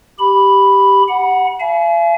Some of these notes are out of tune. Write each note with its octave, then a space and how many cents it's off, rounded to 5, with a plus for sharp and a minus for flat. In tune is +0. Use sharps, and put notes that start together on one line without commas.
G4 +0 B5 +0
F#5 +0 B5 -40
F5 -45 G#5 +40